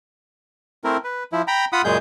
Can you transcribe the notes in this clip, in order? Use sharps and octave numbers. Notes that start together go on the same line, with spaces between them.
A3 C4 E4 A#4
B4
F3 E4
G5 A#5 B5
F4 F#5 B5 D#6
F#2 A#2 C#3 G#3 G#4 G6